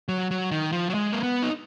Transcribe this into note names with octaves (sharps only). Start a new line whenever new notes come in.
F#3
F#3
D#3
F3
F#3
G#3
A#3
B3
D#4